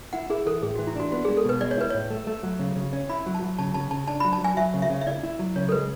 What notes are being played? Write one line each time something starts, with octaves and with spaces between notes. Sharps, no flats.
E4 F#5
E4 G#4
E3 A4
A2 G#4
E3 F#4
E4
D4 F#4
B3 F#4
G#3 G#4
A4
B2 B4
G#3 D5
C#5
E4 B4
A2 C#5
A3
A3
F#3
C#3
C#3
C#4
E4 B5
F#3
A5
F#3
C#3 A5
C#3 A5
C#3 A5
D4 A5
F#3 B5
A5
F#3 G#5
F#3 E5
C#3
E5
C#3
E5
E4 D5
E4
F#3
C#3 C#5
A4
G#3 B4